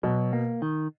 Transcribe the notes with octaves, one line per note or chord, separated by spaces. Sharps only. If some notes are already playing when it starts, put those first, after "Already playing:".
B2 F#3
A#3
D#3